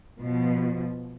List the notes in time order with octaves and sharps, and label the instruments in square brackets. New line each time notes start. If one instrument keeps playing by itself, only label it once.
[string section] B2 F3